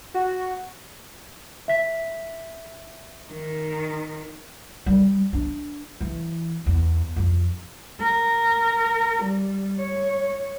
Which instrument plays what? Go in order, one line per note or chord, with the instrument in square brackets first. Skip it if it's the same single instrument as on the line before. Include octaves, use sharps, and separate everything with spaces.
[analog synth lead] F#4
[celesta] E5 B6
[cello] D#3
[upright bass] G3
D4
E3
E2
F2
[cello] A#4
G3
C#5